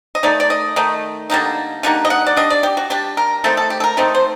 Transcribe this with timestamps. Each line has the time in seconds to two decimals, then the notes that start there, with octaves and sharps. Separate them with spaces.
0.15 D#5
0.23 D#3 A3 D#4 D5
0.40 D5
0.50 D#5
0.76 D#3 A3 D#4
1.30 D3 G3 A#3 D#4
1.83 D3 G3 A#3 D#4 F#5
2.05 D#5
2.10 F#5
2.26 D5
2.37 G3 D4 D#5
2.50 D5
2.63 G4
2.77 F#4
2.90 G3 D4 G4
3.17 A#4
3.44 D#3 A3 C4 D#4 A4
3.57 A4
3.70 G4
3.80 A4
3.84 A#4
3.97 D#3 A3 C4 D#4 A4
4.14 C5